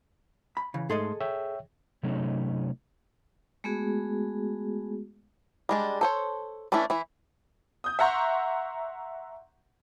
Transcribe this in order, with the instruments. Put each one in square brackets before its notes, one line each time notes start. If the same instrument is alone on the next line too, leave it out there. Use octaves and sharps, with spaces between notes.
[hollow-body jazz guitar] B5
C#3 E3
[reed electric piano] G#2 A3 C6 [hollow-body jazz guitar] G#4 A4 D#5
[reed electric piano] C#5 E5 G5
[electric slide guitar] C3 F#3 A3 C#4 D#4 G#4
[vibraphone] G#3 A3 B3 F#4 G#4
[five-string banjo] G3 G#3 D4
A4 C5 C#5
E3 A3 C#4 D4 E4
E3 E4
[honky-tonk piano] D#6 G6
E5 F#5 A#5 C6 C#6